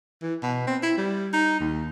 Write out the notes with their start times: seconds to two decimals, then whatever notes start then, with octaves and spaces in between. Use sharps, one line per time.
0.22 E3
0.43 B2
0.67 C4
0.83 E4
0.98 G3
1.33 D#4
1.60 D#2